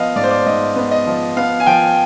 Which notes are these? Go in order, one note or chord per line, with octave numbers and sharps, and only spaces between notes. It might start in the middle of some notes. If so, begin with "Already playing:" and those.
Already playing: F3 B3 D#5 F5
G#2 D5
C5
D5
G#2 D#5
B3
D#5
F3
B3 F5
G#5
F3 G5